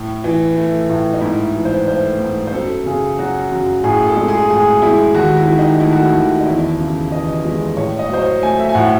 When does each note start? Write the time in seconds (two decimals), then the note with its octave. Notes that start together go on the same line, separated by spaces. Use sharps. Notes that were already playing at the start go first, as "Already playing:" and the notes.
Already playing: A2
0.24 E3
0.57 A3
0.89 A2
1.13 D#4
1.21 G#2 E4
1.55 E3
1.65 C5
1.87 A3 C5
2.20 G#2
2.47 C5
2.53 F#2 A4
2.86 C#3 G#4
3.18 F#3 F#4
3.52 F#2
3.84 A2 G#4
4.06 A4
4.16 G#3
4.28 G#4
4.50 A2 G#4
4.82 G#3 E4
5.14 D#2 F#4
5.37 E4
5.48 D#3
5.59 D#4
5.80 A3 E4
5.93 F#4
6.05 E4
6.13 D#2
6.40 D#4
6.46 E2 E4
6.79 C#3
7.12 E3 D#5
7.45 G#3
7.77 A2 C#5
7.99 D#5
8.10 F#3 C5
8.21 C#5
8.43 A3 G#5
8.60 E5
8.69 G#5
8.75 A2 F#5